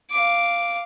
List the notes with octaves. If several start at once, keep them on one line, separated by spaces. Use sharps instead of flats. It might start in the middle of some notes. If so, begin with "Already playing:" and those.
F5 D6